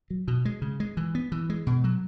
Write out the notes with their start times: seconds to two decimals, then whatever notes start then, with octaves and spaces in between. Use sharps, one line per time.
0.10 F#3
0.28 B2
0.45 G#3
0.62 C#3
0.80 G#3
0.97 E3
1.15 B3
1.32 E3
1.50 G#3
1.67 B2
1.84 F#3